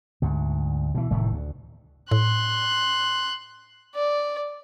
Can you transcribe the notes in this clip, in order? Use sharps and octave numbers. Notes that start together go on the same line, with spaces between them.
D2 G#2
B2 E3
F1 A2 D#3 E3
D2
A2 C6 F#6
D5